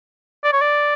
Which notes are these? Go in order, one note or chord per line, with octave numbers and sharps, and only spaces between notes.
D5
C#5
D5